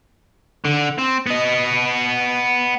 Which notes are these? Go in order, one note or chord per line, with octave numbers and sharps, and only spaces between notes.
D3
C4
B3 D#5